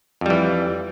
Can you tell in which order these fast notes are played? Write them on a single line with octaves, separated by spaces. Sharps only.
F2 G3 E3